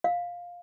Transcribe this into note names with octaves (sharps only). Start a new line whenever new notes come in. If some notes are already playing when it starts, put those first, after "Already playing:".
F5